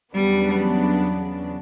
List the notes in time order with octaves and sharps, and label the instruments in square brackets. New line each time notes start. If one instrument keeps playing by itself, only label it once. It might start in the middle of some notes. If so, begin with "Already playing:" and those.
[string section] E2 C#3 F#3 B3 D4 [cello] G3